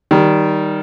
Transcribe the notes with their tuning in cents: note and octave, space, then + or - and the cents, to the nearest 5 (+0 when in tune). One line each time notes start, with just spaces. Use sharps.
D#3 +0 G3 -15